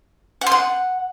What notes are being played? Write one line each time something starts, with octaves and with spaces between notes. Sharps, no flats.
F#5
C6
F#5